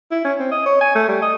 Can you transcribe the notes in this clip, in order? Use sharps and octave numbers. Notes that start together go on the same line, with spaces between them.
E4
C#4
C4
D#5
C#5
G#5
A3
G3
D#5